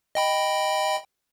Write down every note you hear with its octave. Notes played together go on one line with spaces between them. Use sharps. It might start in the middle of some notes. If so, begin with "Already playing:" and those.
D#5 G5 B5